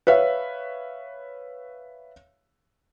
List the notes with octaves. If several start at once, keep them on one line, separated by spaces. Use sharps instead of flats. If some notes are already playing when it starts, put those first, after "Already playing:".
B4 C#5 E5 F5